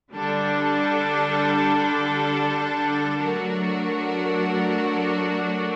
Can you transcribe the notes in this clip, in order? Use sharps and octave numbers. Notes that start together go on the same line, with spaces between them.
D3 G3 D4 A4
F#3 A3 D4 F#4 A#4